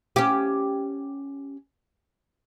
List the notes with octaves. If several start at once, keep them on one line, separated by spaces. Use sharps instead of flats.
C#4 G4